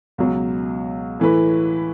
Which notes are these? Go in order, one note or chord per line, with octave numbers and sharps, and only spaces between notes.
C#2 B2 F#3
A2 E3 A3 E4 B4